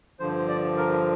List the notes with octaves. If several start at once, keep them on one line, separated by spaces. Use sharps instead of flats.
G2 D3 F3 C5
D5
A#4